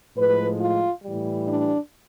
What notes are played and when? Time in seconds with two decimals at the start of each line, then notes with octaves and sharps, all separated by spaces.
0.16 A2 F3 G#3 B4
0.60 F4
1.03 A2 E3 G3
1.47 D4